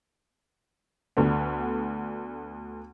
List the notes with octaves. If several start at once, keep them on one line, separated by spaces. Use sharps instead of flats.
D2 D3 A3 B3